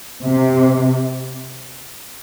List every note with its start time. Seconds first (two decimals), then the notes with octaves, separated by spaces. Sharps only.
0.24 C3